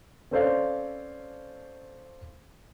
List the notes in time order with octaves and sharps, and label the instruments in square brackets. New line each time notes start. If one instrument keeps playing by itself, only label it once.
[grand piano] C4 C#4 A4 C5 D5 F5